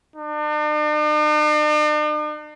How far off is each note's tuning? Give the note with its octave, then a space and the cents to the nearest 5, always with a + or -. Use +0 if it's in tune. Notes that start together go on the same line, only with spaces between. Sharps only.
D4 +45